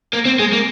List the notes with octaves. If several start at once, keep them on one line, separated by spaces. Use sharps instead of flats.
A#3
C4
G#3
A#3